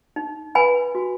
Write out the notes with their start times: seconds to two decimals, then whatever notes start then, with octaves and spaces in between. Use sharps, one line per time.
0.16 D#4
0.55 B4 G#5 B5
0.95 F#4